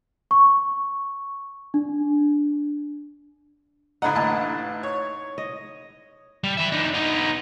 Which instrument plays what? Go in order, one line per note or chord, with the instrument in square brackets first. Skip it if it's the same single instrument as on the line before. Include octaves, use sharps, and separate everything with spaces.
[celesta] C#6
D4
[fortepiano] A1 D3 F#5 [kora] D#4 E4
[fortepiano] A1 A2 A5
C#5
[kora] D#5
[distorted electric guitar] G3
B4 E5
D4 D#4
B3 D#4